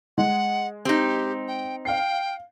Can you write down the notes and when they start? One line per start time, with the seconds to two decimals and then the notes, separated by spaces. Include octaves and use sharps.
0.18 G#3 F#5
0.85 C4 D#4 G4
1.48 G5
1.85 F5 G5 C7